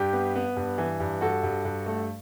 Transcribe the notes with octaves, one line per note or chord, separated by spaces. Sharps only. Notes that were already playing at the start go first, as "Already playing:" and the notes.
Already playing: G2 G4
B3
B3
G2
E3
G2
G2 F#4 A4
G2
G2
A3